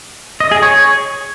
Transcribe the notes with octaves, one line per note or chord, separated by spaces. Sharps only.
D#5
G#4
C#5